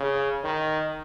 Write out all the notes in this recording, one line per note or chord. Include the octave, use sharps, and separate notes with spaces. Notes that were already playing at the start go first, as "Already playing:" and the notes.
Already playing: C#3
D#3